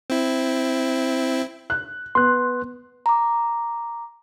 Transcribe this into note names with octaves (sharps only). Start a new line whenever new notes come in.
C4 E4
F#6
B3 C6 F#6
A#5 D6